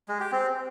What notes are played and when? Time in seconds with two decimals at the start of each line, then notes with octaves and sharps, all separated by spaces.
0.08 G#3
0.20 G4
0.32 C4